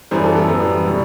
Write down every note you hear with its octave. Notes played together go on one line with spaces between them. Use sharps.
F#2 E3 G3 B3 C5
A4
A4
F#2 E3 G3 B3
B2 G3 B3